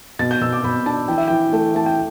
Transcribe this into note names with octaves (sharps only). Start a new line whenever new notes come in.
B2 A6
G6
B2 E6
D6
B2 B5
D4 A5
E3 G5
E5
E3 G5
A3
A3 A5
G5